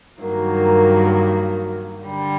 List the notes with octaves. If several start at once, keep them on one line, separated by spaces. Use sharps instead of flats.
G2 D#3 F#3 A#3
D3 G3